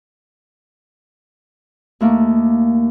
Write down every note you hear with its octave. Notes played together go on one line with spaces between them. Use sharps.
D#2 A3 A#3